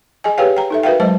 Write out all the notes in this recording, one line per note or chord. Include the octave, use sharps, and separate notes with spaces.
G#4 D#5 G#5
G4 G#4 B4 C#5 F5 G5
G5 A#5
D#4 A4 E5
F#4 A#4 B4 E5 F5 G5
F#3 G#3 C5 D#5 A5